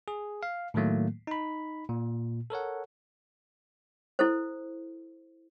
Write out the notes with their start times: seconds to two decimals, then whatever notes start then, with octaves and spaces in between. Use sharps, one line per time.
0.08 G#4
0.43 F5
0.74 A2 D#3 F#3 A3 A#3
1.27 D#4 B5
1.89 A#2
2.50 A4 A#4 C#5 F#5
4.19 E4 A4 C5